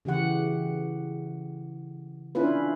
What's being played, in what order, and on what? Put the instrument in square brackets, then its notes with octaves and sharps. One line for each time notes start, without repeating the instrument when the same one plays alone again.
[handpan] C#3 E3 G4 F#5
C#4 D4 E4 F4 B4